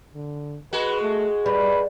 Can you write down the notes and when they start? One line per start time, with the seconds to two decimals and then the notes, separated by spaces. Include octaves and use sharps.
0.14 D3
0.73 G#3 F#4 B4
1.02 A3
1.46 G3 B4